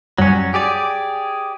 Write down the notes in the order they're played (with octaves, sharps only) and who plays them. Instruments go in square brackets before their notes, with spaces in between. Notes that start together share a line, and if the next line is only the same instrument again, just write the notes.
[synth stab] F#2 G3 [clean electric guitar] F#3 C#4
[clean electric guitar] G4 G#4 D5